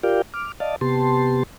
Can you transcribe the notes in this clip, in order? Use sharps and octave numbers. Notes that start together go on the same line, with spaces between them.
F4 G4 A#4 D5 F5 G5
D6 F6
D5 D#5 F5 A5
C3 B3 G4 A5 C6